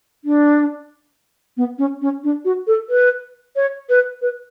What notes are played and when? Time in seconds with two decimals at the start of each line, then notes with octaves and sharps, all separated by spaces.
0.24 D4
1.57 B3
1.78 C#4
2.01 C#4
2.24 D4
2.45 F#4
2.67 A4
2.89 B4
3.56 C#5
3.89 B4
4.22 B4